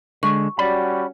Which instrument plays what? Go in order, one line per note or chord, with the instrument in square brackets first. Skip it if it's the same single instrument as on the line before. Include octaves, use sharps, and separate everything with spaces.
[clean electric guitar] D3 G#3 [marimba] C#6
[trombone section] G3 C#4 F#4 [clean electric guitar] D5 B5